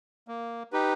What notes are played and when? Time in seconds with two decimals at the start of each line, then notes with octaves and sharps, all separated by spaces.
0.28 A#3
0.72 D#4 G4 B4